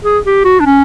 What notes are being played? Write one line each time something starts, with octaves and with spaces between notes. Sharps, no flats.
G#4
G4
F#4
D4
C#4